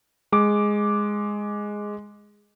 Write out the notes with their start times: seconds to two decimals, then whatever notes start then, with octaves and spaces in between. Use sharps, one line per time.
0.32 G#3 D6